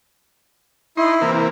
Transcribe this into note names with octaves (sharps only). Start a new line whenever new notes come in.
D#4 E4 C6
C3 E3 A#3